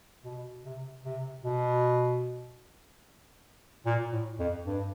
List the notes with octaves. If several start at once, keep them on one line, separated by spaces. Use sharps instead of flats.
B2
C3
C3
B2
A#2
A2
F2
G2